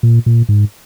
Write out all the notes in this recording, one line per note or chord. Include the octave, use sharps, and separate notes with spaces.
A#2
A#2
G#2